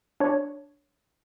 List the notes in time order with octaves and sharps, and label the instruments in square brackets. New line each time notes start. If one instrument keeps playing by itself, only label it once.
[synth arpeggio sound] D4 C#5